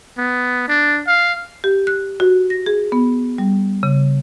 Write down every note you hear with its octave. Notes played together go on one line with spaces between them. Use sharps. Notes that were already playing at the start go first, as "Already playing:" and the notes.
B3
D4
F5
G4
F#6
F#4
A#6
G#4
B3
G3
C#3